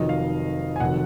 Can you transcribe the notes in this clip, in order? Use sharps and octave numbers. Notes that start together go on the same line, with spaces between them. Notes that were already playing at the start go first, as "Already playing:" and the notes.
Already playing: F1 F2 D#3 F#3 D#5
F5
G#5
F1 D#3 F#3 F#5